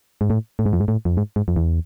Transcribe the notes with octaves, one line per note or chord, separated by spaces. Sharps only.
G#2
A2
A2
G#2
F2
G#2
A2
F2
G#2
G#2
F2
E2